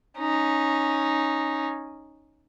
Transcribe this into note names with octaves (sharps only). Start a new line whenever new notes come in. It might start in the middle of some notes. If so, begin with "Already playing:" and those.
C#4 D#4